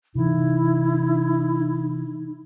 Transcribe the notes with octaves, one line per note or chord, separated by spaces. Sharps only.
C3 E3 D#4 E4